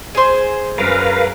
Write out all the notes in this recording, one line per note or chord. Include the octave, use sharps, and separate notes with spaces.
G#4 C5
F#2 A#4 B4 F5